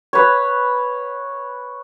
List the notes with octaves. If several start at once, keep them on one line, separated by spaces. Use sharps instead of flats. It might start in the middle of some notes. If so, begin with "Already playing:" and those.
B4 C#5